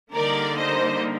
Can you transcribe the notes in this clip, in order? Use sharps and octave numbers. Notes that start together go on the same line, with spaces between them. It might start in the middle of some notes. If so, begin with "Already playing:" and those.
D3 G3 A#3 D#4 A#4 D5
C5 D#5